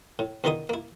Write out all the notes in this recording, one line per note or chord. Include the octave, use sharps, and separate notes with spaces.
A2
E2 D3 D#3 D#4 E4 D#6
A#3 E4